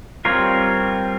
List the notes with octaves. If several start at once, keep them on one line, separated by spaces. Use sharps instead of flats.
G3 C4 F4 A#4 C#5